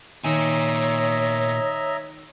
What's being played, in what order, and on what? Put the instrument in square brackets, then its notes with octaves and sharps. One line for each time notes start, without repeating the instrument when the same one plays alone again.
[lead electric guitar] A#2 G#5 [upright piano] D#3 [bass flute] C#5 [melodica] D#5 E5 A#5